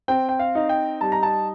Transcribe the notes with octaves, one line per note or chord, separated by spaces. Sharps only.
C4 G5
G5
F5
D#4
G5
G3 A5
A#5
A5